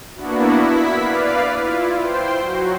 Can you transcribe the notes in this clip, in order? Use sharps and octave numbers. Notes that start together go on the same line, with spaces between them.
A#3 B3 D4 E4 F#4
E4 B6
B4 D5 F5
E4 F4
C5 G5 C6
F#3 F#4